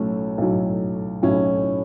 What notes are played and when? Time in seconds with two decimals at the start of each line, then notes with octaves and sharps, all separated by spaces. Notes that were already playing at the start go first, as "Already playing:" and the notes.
Already playing: B1 A2 F#3 A3 C#4
0.38 B1 A2 F#3
1.22 B1 A2 F#3 C#4 E4